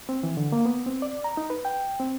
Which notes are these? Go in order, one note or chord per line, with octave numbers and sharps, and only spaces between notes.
C4
E3
D3
A#3
B3
C4
D5
A#5
D#4
B4
G5
C4